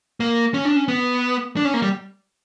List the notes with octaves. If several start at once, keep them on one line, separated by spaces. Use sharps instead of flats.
A#3
C#4
D4
C#4
B3
D4
C#4
A#3
G3